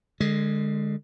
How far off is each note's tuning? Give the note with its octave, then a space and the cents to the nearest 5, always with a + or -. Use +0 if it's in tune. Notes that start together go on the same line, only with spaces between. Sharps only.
D3 +25 G#3 +0